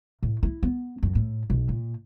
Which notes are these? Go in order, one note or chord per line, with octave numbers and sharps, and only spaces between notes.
A2
E4
B3
F#2
A2
B1
A#2